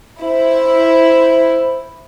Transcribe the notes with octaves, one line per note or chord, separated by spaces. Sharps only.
E4 C5